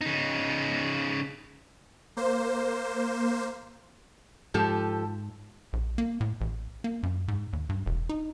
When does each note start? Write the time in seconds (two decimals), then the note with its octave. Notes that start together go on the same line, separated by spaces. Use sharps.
0.01 C#3 D#4
2.17 A#3 C5
4.54 G#2 F3 G4 A4
5.73 A#1
5.98 A#3
6.20 A2
6.41 A1
6.84 A#3
7.03 F#2
7.28 G#2
7.53 D#2
7.69 G2
7.86 E1
8.09 D#4